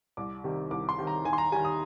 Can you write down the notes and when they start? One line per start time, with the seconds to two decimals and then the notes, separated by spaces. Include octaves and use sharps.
0.17 C2 D6
0.44 C3 D#3 G3
0.71 C2 D6
0.89 C6
0.98 C3 D#3 G3
1.07 A#5
1.25 D#2 G#5
1.33 C6
1.38 A#5
1.52 D#3 G3 G#5
1.65 D#6